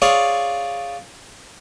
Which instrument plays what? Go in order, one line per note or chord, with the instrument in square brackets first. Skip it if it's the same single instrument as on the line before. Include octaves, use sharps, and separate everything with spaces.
[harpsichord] F4 G#4 C#5 D5 F5